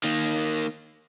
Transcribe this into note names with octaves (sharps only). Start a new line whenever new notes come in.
D#3 A#3